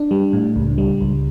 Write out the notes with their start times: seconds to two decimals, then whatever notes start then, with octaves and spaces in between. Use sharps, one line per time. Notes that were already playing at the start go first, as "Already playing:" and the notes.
Already playing: D4
0.11 G3
0.33 A2
0.56 C#2
0.78 G3
1.01 C#2